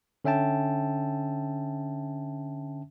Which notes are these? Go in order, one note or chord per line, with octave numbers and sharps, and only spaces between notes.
D3 C#4 E5 G5 A5